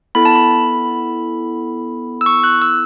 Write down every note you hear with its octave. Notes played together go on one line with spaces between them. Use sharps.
B3 E4 A4 B5
A5
B5
E6
C#6
F#6
E6